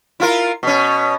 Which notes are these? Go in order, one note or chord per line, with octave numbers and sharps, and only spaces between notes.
E4 F4 A#4
B2 C#4